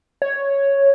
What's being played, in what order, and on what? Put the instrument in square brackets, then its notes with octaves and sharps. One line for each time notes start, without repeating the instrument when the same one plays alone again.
[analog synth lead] C#5